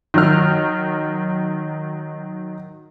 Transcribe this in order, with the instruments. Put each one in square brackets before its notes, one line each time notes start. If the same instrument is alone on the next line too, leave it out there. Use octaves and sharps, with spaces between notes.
[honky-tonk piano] D#3 F#3 F6